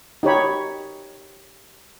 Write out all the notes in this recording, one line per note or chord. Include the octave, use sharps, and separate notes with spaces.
D#4 G4 C#5 B5